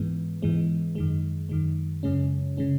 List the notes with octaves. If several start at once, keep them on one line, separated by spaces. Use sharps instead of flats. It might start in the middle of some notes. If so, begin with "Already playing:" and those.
Already playing: G#2 E3 G#3 B3
G#2 E3 G#3 B3
F#2 D#3 G#3
F#2 D#3 G#3
F#2 C#3 G#3 C#4
C#3 G#3 C#4